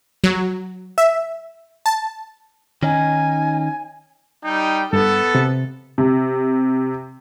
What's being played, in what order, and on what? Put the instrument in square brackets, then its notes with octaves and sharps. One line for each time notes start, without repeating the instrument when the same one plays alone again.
[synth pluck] F#3
E5
A5
[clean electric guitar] D#3 C#4 D#4 [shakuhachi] G#5
[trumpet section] G3 D#4 G5
[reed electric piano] G2 [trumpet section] B3 A4
[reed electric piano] C3
[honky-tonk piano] C3